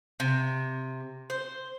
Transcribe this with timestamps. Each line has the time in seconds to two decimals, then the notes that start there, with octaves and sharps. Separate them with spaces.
0.20 C3
1.30 C5